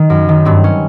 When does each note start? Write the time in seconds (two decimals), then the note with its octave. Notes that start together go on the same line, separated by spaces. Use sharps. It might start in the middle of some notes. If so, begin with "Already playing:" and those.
Already playing: D#3
0.10 F#2
0.29 D#3
0.45 G2 C4
0.64 C#4